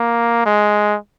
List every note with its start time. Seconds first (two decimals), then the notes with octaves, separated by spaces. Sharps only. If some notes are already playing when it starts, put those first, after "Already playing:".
Already playing: A#3
0.46 G#3